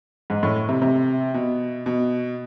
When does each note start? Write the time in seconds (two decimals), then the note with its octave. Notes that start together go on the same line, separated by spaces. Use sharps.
0.30 G#2
0.43 A2
0.69 C3
0.82 C3
1.34 B2
1.86 B2